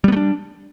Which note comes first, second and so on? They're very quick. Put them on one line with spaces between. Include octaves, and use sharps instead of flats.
G3 B3 A3 D4